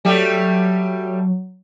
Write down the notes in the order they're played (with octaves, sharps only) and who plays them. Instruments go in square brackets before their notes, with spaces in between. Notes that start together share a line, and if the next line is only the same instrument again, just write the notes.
[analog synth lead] F#3 [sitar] G3 A3 G4